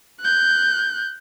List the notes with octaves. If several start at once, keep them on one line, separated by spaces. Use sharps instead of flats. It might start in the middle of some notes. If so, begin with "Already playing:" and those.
F#6 G6